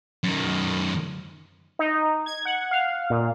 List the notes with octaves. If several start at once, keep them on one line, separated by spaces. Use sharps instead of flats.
F#2 D#3
D#4
G#6
F#5
F5
A#2